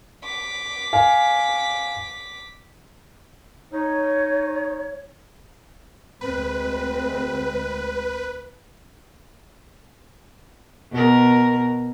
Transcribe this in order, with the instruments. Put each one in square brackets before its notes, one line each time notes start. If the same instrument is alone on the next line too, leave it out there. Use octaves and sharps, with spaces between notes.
[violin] D6 B6
[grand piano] F5 G#5
[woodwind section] D#4 [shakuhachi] C#5
[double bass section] D2 G#3 C4 [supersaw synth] B4
[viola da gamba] B2 A#4